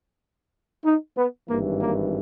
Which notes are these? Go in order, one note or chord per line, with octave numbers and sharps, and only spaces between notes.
D#4
B3
G#1 G2 E3 A#3
A#3